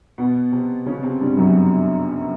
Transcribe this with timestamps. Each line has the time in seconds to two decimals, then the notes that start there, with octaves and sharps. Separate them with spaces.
0.18 B2 B3
0.52 C3 C4
0.86 C#3 C#4
1.03 C3 C4
1.20 G2 G3
1.37 F#2 F#3